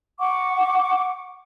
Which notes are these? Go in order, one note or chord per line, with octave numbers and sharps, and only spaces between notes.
F#5 C#6 D6